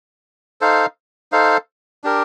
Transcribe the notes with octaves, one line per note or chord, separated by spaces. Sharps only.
D#4 A4 C5 F5
D#4 A4 C5 F5
D4 G4 A#4